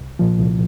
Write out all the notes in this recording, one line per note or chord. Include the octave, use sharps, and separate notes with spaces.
C2
A#2 F3
C2